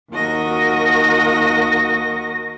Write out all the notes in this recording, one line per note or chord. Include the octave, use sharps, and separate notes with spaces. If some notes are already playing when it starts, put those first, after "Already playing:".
D#2 F#4 A#4 D#5 A#6